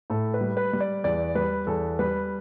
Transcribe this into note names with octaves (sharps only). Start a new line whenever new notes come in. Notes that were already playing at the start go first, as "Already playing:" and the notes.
A2 A4
B4
G3
B4
G3
D5
E2 D5
G3 B4
E2 A4
G3 B4